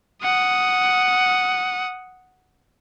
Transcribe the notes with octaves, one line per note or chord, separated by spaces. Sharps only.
F#5 D#6